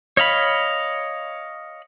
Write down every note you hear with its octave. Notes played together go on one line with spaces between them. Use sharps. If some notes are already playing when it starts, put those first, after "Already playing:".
C#5 D#5 F5 B5